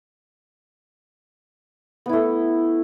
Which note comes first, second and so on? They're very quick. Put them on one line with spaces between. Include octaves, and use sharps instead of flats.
B3 E4 A3